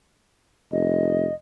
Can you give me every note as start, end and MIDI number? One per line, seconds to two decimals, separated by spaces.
0.72 1.27 29
0.72 1.34 75